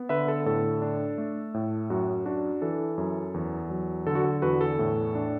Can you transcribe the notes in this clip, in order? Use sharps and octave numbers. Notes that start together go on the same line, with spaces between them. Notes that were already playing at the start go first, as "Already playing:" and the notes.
Already playing: B3
D3 B4 E5
A4
A2 A4
D4
A3
A2
F#2 F#4
D4 F#4
E3 A4
F#2
E2
F#3
D3 A4
F#4
A4
E2 F#4 B4
A4
A2
D4